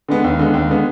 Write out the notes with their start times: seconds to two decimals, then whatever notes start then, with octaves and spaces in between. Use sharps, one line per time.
0.09 D3 G#3 B3
0.24 D#2
0.39 D3 G#3 B3
0.54 D#2
0.70 D3 G#3 B3